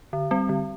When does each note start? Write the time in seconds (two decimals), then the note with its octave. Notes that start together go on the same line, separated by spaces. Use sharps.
0.13 D3
0.31 G3 C4
0.49 D3